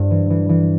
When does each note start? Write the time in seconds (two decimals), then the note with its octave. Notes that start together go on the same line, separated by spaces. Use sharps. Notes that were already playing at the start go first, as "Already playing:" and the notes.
Already playing: G2 C4 E4
0.11 E3
0.30 E3
0.49 E3